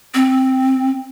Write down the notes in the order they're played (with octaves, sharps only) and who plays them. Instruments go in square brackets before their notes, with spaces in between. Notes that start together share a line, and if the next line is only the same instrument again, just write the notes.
[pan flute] C4